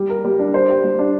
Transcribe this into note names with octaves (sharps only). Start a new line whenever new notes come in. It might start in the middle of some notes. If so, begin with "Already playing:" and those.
Already playing: G3
A#4
G3
D4
C5
G4
G3
D4